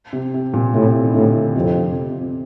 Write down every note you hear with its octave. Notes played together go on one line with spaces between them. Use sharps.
C3
C3
A#2
A2 C3
D#3
A2 D3
F2 C3
C3
C3